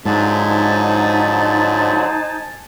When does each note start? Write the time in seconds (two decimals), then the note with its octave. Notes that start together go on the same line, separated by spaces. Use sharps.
0.05 G#2 D3 F3 F#3 D#4 C5 G#5 A5